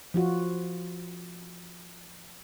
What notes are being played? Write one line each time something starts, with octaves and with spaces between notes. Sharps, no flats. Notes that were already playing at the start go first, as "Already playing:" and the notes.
F3 F4 F#4